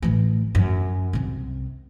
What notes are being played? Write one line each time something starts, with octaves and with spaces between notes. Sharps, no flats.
A1 E3
F#2
C2 C3